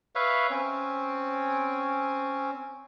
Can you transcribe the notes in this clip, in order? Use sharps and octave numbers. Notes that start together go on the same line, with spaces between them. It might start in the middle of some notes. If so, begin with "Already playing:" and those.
B4 C#5 E5 F5
C4 C#4